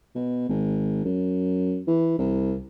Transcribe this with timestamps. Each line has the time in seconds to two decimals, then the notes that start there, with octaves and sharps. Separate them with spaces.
0.15 B2
0.49 G#1
1.05 F#2
1.87 E3
2.18 C2